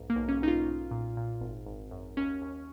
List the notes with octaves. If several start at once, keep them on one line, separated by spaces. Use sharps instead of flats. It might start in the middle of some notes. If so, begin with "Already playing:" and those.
Already playing: B1 G#2
A#3
B1
C#4
B1 D#4
F4
B1
A#2
A#2
G#1
G#1
F#2
D#2 C#4
D#2